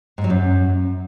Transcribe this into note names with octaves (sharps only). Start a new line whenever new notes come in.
G#2
F#3
F#2